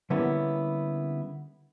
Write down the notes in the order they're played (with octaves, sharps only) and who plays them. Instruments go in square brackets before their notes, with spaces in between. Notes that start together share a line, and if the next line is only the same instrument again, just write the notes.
[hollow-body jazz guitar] D3 G3 A#3 B3 C#4 E4